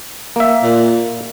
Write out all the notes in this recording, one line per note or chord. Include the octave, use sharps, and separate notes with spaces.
A#3 E5
A#2